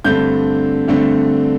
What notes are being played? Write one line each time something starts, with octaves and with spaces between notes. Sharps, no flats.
G2 D3 A3 C4 G6
G2 D3 A3 C4